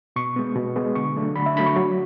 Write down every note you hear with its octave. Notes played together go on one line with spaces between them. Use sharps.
B2 C#6
G#3 B3
B2
G#3 B3
D3 C#6
F#3 A3 D4
D3 B5
E5
F#3 A3 D4 B5
C#6
F#3